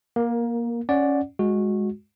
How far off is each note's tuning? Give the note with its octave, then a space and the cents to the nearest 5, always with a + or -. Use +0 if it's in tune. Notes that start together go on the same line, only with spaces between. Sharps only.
A#3 +20 A#4 +0
C#4 +0 D5 +0 F#5 +0
G#3 +0 F#4 -15